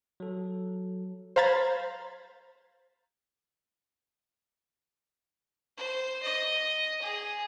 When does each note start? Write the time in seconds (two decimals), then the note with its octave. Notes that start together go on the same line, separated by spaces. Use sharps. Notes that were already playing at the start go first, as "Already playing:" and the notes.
0.20 F#3 A4
1.36 C5 F5 A#5 B5 G#6 A6
5.77 C5
6.23 D#5
7.02 G#4